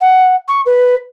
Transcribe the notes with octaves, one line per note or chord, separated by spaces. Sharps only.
F#5
C#6
B4